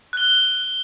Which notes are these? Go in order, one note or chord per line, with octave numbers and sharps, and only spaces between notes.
F#6 G7